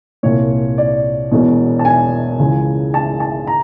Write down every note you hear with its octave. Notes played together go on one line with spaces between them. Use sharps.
C2 A#2 C#5
D5
E1 E2 B2
A5
G#5
C#2 C#3 E3
A5
A5
A#5